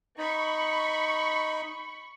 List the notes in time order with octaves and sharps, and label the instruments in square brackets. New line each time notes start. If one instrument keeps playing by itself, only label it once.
[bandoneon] D#4 [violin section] B5 C#6